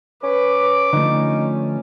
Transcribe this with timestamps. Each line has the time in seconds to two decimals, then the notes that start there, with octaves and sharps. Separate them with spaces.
0.23 C#4 B4 D6
0.93 D3 F3 A3 C#4 D#4